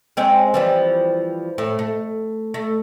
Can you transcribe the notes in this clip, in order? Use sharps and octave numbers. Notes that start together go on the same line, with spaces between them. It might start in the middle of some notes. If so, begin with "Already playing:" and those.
G#3 C4 C#4
E3 F3 G3
A2
A3
A3